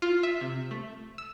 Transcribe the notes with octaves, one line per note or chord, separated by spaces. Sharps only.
F4
E5
C3
A3
E6